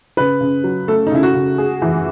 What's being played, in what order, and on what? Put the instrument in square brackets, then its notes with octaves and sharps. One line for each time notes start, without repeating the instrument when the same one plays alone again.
[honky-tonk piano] C#3 [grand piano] B4
[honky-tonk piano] C#3
F#3
[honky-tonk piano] A3 [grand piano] A4
[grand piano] D#4
[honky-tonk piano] C#3 [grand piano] E4
[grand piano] F#4
[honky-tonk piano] C#3
G#4
E3